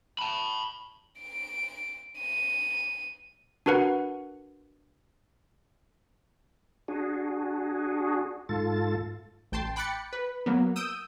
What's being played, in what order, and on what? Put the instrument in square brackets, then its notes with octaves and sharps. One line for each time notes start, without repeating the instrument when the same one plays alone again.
[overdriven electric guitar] A5 B5
[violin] D7
D#7
[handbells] D4 F#4 A#4 B4 F#5
[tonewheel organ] D4 F#4 G#4
G#2 F4 A4 A6
[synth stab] A1 G5 A5 C6
G5 B5 D6 F#6 A6 C#7
B4
F#3 A#3 B3
D#6 E6 G6 D7 D#7